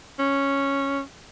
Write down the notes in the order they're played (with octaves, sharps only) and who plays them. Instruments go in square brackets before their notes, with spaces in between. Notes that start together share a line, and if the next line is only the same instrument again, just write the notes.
[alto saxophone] C#4